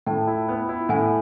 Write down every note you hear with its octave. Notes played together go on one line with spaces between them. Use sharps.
A2 G5 A5
E4
B3
E4
A2 F#5 G#5